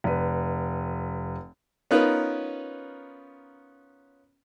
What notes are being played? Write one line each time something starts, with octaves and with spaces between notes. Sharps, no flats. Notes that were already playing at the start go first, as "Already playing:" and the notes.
F1 B4
B3 C#4 D#4 F4 A#4 B4